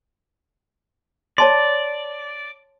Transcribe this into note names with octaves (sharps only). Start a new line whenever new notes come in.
C#5 D5 A5 C6